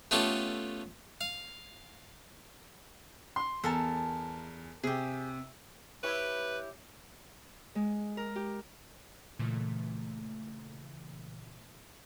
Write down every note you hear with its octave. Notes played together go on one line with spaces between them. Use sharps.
A3 B3 C#4 F4 G4 A4
F5
C6
E2 A4 A#4 A5
C3 G4 G#4
E4 G4 B4 C#5
G#3
A#4
G4
A#2 C#3 E3 A3